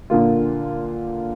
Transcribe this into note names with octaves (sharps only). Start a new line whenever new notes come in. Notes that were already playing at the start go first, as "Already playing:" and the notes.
A#2 D3 A#3 F4